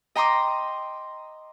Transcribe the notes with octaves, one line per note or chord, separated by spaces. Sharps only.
D#5 G5 A#5 C6 D6 D#6